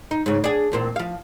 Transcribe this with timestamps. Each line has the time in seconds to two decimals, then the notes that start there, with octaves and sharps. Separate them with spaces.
0.11 D#4
0.26 G#2 C#3
0.44 D4 G#4
0.72 E2 A#2 C4
0.96 F3 F5